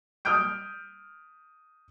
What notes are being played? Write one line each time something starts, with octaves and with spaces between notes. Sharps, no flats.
D#6 F6 G6 D7